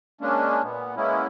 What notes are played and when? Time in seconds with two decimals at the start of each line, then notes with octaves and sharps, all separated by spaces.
0.21 G#3 A#3 C#4 D4
0.63 A#2 B3
0.96 G#3 A#3 B3 C#4 E4